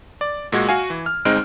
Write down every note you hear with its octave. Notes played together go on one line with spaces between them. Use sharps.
D5
A#2 G#3 F#4 G#6
F#4 F5 G#5
E3
F6
G1 G#3 C4 D#4 F6 D7